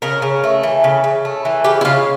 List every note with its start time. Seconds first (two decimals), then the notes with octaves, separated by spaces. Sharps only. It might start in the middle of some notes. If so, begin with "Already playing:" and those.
0.02 C#3 A#4
0.22 C#3
0.44 A3
0.63 E3
0.84 C#3
1.04 C#3
1.25 A3
1.45 E3
1.64 C#3 G4
1.81 E4
1.85 C#3 F4